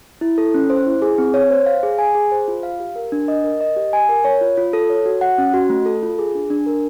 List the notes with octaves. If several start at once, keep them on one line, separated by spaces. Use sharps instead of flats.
E4
A4
C#4
C5
E4
G#4
C4
C#5
C5
F5
G#4
G#5
G#4
C5
F4
F5
G4
A#4
D4
D#5
A#4
D#5
G4
G#5
A#4
C#5
F4
F4
A4
C#5
F#4
F#5
C#4
F#4
A3
A4
F4
G#4
D4
D4
A#4